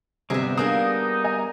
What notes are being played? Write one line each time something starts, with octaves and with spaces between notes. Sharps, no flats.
G1 C3 G3 B3 G#4 E5 A#6
A#3 D4 D#4 G#4 D#6
D#5 G#5 A#5